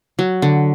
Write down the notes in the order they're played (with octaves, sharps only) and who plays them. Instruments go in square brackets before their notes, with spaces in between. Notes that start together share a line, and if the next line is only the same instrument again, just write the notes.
[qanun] F#3
D3